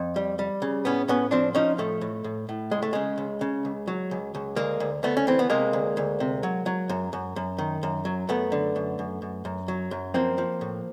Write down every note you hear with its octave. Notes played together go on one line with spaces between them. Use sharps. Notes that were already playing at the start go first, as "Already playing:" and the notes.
Already playing: F2
G3
G3
C#3
A2 B3 C#4
A2 B3 C#4
F3 C4 D4
F3 C#4 D#4
A2 A3
A2
A2
A2
C#2 G#3
A3
C#3 G#3
C#2
C#3
C#2
F#3
C#2
C#2
D2 G#3 A#3
D2
D2 A3 B3
C#4
E3 C4
B3
C3 G#3 A#3
D2
D2
C3
F#3
F#3
F#2
F#2
F#2
D#3
F#2
F#3
F#2 A3 B3
D3
F#2
F#2
F#2
F#2
F#3
F#2
F3 A#3 C4
F3
A2